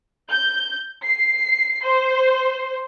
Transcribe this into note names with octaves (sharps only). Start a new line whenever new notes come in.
G6
C7
C5